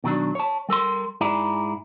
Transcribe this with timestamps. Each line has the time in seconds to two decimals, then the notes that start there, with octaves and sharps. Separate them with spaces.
0.04 B2 D#3 F#3 D4
0.35 C#5 A5
0.69 G3 A4 A#4 C6
1.21 G#2 E4 G#4 D5 A#5